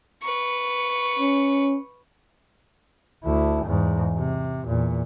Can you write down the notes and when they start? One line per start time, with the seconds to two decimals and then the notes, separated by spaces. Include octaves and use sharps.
0.22 B4 C#6
1.19 C#4
3.24 D2 E4
3.65 E2 G#2
4.18 C3
4.67 E2 A#2